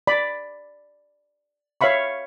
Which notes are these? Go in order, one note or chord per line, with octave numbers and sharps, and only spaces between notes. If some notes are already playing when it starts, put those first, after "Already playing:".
D5 B5
C#5 E5 F5 B5 C#6